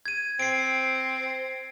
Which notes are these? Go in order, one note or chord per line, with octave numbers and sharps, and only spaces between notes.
G#6 D#7
C4 C7 D7